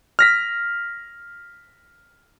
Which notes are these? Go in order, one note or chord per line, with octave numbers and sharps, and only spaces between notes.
F6 A#6 B6